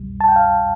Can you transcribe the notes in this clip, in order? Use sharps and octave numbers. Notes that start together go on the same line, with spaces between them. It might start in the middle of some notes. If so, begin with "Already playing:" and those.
Already playing: C2 B2 G3
A5
G5
F5